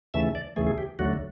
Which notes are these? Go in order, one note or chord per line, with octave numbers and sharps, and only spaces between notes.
D#2 C#3 E3 A3 E5
D5
D#2 C#3 E3 A3 G#4
G#4
G4
D#2 D3 F#3 A3 F#4